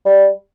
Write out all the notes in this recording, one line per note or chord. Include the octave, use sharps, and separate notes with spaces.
G3